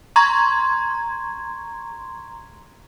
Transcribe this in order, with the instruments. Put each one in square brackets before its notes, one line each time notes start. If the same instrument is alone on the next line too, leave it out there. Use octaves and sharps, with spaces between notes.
[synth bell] A#5 C6 C#6 G#6